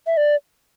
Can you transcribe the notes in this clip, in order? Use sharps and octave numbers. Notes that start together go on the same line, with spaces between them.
E5
D5